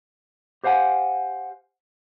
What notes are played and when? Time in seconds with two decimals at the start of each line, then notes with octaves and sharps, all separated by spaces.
0.64 G4 C5 F5 F#5 G#5